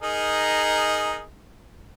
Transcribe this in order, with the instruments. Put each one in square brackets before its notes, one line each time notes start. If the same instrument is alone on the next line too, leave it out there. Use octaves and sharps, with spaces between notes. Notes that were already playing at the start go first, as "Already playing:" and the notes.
[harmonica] D#4 G#4 A#4